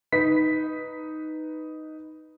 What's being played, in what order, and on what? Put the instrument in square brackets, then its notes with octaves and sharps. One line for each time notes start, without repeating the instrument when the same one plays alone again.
[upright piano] D#4 B4 B6